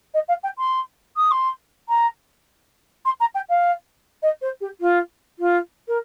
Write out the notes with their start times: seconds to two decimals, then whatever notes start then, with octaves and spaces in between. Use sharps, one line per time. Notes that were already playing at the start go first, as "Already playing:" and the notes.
0.14 D#5
0.29 F5
0.43 G5
0.58 C6
1.17 D#6
1.31 C6
1.89 A#5
3.05 C6
3.20 A#5
3.35 G5
3.50 F5
4.23 D#5
4.42 C5
4.61 G4
4.81 F4
5.39 F4
5.88 A#4